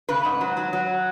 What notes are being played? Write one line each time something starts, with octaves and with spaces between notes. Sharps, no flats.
C#3 B4
G#2
F#3
F#3
F#3